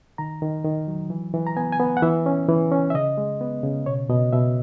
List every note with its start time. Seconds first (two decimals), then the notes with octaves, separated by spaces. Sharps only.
0.18 D#3 A#5
0.42 D#3
0.64 D#3
0.87 F#3
1.10 E3
1.34 E3
1.47 A#5
1.57 B3 G#5
1.72 G#5
1.80 B3
1.97 F#5
2.02 E3 E5
2.26 C#4
2.49 E3
2.72 C#4
2.90 E5
2.94 C#3 D#5
3.18 G#3
3.41 B3
3.63 C#3
3.86 B2 C#5
4.09 B2 D#5
4.33 B2 E5